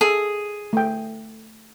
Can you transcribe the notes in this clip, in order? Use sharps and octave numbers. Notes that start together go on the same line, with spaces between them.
G#4 A4
A3 G5